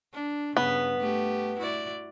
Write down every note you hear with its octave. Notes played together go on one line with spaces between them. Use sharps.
D4
G2 C#3 B3
A3 G4
E4 F#4 D5